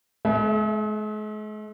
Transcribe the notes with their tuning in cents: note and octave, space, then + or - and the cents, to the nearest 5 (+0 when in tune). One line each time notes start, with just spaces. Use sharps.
G#3 +45 E5 +0